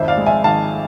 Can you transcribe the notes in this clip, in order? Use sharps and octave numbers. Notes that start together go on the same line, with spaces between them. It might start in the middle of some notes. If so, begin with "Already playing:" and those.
Already playing: G#1 F2 C5 E5
D5 F5
G#3
E5 G#5
G#1 F5 A5